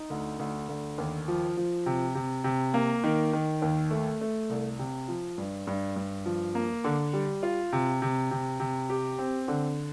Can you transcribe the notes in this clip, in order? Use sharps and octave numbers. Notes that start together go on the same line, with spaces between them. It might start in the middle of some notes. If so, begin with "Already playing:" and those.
Already playing: D#4
D2
D2
D2
D#2
F3
F3
C3
C3
C3
A#3
D#3
D#3
D#2
A3
A3
C2
C3
F3
G2
G2
G2
F3
A#3
D3
G3
F4
C3
C3
C3
C3
G4
C4
D3